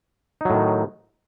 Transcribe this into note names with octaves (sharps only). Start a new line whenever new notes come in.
A2 D#3 F#3 D#4